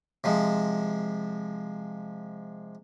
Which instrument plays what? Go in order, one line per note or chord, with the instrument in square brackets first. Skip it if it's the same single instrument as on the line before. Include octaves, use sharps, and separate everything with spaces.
[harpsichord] C3 F3 G#3